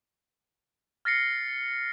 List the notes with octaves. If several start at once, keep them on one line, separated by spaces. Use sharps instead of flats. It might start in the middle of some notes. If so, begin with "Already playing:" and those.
F6 A6 A#6 C7 C#7